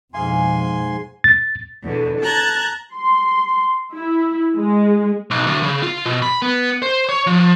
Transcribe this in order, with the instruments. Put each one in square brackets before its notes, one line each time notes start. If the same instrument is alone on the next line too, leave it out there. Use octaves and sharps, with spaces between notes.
[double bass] F2 B2 [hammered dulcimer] G#2 G#4 F5 [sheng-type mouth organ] G#5 C6
[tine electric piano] A6
[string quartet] E2 B2 D3
A5 A#5 F#6 G#6
[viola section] C6
E4
G#3
[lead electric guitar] B1
D2
C#3
F4
B2
B5
B3
C5
C#5
F3